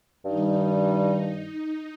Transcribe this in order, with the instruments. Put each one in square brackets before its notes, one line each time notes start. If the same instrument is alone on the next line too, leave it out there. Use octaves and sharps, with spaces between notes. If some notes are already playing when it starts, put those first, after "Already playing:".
[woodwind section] G2 D#3 G3 [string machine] D#4